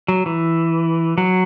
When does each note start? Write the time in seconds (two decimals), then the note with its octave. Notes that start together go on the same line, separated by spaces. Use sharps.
0.08 F#3
0.26 E3
1.18 F#3